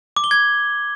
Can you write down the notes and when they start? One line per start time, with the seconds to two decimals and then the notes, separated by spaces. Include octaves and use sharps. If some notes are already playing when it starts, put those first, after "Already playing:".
0.16 D6
0.24 G7
0.31 G#6